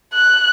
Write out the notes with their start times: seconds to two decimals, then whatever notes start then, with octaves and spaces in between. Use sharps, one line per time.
0.14 F#6